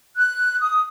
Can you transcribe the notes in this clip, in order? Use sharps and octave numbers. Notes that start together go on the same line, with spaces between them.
F#6
D#6